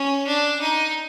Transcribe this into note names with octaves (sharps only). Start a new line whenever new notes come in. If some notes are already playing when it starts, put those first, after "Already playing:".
Already playing: C#4
D4
D#4